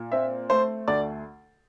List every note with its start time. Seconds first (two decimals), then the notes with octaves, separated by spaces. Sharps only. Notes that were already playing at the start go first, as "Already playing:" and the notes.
Already playing: A#2
0.12 C4 E5
0.49 A3 C5
0.88 D2 D5